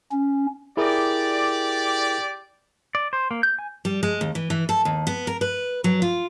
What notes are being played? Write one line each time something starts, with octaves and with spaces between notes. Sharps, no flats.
C#4
E4 G4 G#4 A#4 D5
D5
C5
A#3
G6
G#5
G3
G#3
D#2
E3
E3
A4
D#2
B3
A#4
B4
F#3
F4